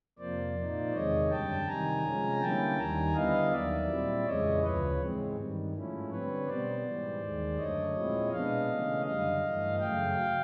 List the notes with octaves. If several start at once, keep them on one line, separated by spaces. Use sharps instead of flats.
F2 C3 F3 A#3 C5 D5
A#2 F3 A#3 D#4
E2 C3 D#3 G#3 C#5 D#5
F#2 D3 G3 G5 A5
C3 D#3 G3 G#5 A#5
C3 F3 G#3 C#4
D3 G3 A#3 C#4 E4 G5 A5
D#2 D#3 G3 G#5 A#5
D3 G3 B3 E4 D#5 F5
D#2 D#3 F#3 D5 E5
A#2 G3 C4 E4
F2 C#3 E3 G#3 C#5 D#5
D2 C#3 F3 B4 C#5
G#2 E3 G#3 C4
G2 D#3 G3
G#2 F3 A3 C#4 E4
D3 G3 C4 B4 C#5
B2 G3 B3 C5 D5
G#2 E3 G3
D#2 D#3 G#3
F#2 D3 F#3 A3 C#5 D#5
A#2 F3 G#3 C4 E4
B2 G#3 B3 D4 D#5 F5
C#3 E3 A3 C#4
F#2 D3 G3 D#5 F5
G2 E3 A3
F#2 C#3 F#3 A3 F5 G5